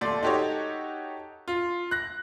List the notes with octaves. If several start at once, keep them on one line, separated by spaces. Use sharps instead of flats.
D#1 A3 D5 C6
D#4 F#4 G4 A4 C#5
F4
F#6 A#6